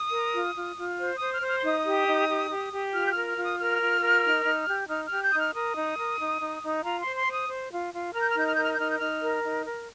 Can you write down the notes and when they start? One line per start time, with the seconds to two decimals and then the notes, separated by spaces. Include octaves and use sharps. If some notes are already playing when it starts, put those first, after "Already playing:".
Already playing: D#6
0.12 A#4
0.34 F4
0.56 F4
0.77 F4
0.99 C5
1.15 D#6
1.20 C5
1.31 F6
1.42 C5
1.47 F6
1.57 C6
1.64 D#4 D#6
1.85 G4
2.07 D#4
2.29 G4
2.50 G4
2.72 G4
2.93 F4 F6
3.05 G6
3.10 F6
3.15 A#4
3.26 F6
3.37 F4
3.43 D#6
3.58 A#4 F6
3.81 F4
4.02 A#4
4.24 D#4
4.46 D#4
4.67 G4
4.89 D#4 F6
5.05 F6
5.10 G4
5.22 G6
5.31 D#4 D#6
5.38 F6
5.54 A#4 D#6
5.75 D#4
5.97 A#4
6.19 D#4
6.41 D#4
6.62 D#4
6.84 F4 A#5
7.00 C6
7.05 C5
7.16 C6
7.27 C5
7.32 D#6
7.49 C5
7.71 F4
7.92 F4
8.14 A#4 F6
8.22 G6
8.30 F6
8.35 D#4 G6
8.47 F6
8.56 A#4 G6
8.64 F6
8.72 G6
8.79 D#4 F6
8.90 G6
8.97 D#4 F6
9.22 A#4
9.43 D#4
9.65 A#4